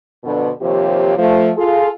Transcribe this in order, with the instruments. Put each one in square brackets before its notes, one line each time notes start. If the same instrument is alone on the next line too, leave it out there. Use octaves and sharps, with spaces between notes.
[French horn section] F2 B2 D3
D#2 C3 F3 G4 C#5
F3 A3
F4 G#4 A4